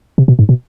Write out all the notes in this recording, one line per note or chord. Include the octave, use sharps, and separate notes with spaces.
C3
B2
G#2
B2